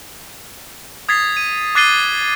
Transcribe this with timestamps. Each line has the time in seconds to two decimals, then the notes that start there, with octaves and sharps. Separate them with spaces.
1.09 D#6 G#6 A6 B6 C7
1.37 D#7
1.75 D6 F#6 A6 C7 D#7 G7